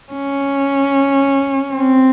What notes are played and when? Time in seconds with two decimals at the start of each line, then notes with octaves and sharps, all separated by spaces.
0.13 C#4
1.74 C4